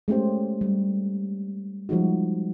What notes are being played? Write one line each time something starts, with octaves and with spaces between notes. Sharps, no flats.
G#3 A3 C#4 G4 C5
G3
F3 G3 G#3 D#4 F#4